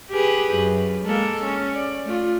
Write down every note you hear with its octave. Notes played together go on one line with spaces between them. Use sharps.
G4 G#4 B4
F#2
G#3 A#3 A4
C#4
D5
A3 F4